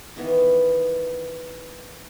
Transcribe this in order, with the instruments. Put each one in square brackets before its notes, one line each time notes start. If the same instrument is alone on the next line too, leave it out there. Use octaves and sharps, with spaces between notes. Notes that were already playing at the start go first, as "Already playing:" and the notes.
[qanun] D#3 E3 B3